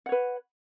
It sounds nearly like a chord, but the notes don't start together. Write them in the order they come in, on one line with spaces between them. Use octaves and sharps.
F#5 C#5 B4